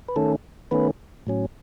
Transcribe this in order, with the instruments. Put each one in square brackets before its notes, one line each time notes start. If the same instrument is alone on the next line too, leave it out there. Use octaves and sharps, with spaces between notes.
[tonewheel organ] B4
D#3 A3 C#4 A4
D#3 A3 B3 C#4 B4
A2 F#3 C#4